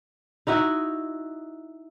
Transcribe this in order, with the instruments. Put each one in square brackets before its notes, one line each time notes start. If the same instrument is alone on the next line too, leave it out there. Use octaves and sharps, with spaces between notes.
[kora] D#4 E4 F#4 D#5